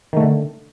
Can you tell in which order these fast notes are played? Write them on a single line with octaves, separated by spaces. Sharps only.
D#3 A3 D3